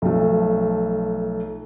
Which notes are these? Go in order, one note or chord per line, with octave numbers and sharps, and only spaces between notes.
B1 F3 A3